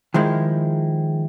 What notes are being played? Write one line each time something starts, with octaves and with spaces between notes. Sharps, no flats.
D#3 F3 G#3 E4